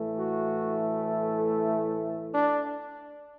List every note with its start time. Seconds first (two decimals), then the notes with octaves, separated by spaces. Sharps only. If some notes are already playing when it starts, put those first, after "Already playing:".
Already playing: A2 E3 A3
0.18 F#4
2.35 D4